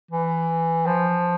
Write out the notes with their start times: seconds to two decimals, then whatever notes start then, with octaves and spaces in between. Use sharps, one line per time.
0.11 E3
0.86 F3